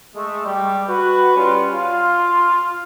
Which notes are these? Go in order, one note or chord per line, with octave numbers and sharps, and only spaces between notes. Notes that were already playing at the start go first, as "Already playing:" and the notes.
G#3 A3
G3 G4
F#4 B4
G3 C#4 F4
F4